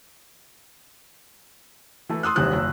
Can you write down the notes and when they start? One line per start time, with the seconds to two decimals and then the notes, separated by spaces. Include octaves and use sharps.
2.09 E3 A3
2.23 C6 D#6 E6 F#6
2.36 D#1 G#1 C3 E3 F#6
2.53 F#1